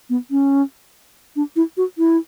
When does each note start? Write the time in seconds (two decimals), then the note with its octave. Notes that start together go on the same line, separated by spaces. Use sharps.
0.10 B3
0.31 C#4
1.36 D4
1.56 E4
1.77 F#4
1.98 E4